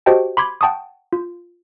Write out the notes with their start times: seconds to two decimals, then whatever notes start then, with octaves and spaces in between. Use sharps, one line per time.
0.06 F#4 G4 C5 D#5 G5 A5
0.37 B5 C6 D6 G#6
0.61 F#5 G5 A5 C#6 D#6
1.13 F4